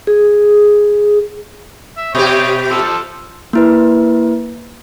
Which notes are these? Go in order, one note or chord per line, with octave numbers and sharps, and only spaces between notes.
G#4
E5
B2 G4 C#5 D#5
F3 A4 E6
A#3 E4 B4